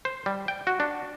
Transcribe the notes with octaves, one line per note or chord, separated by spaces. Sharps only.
C5
G3
G5
F#4
D4